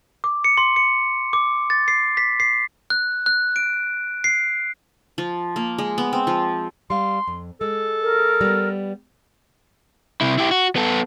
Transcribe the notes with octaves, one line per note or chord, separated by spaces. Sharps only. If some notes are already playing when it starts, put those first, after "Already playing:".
D6
C#7
C6
C#7
D6
A6
C7
B6
C7
F#6
F#6
D7
C7
F3
A#3
G#3
B3
C4
F3
G3 F5 C6
F2
G#3 A4
A#4
G3 B3
C3 E4
E4 G4
F#4
B3 A4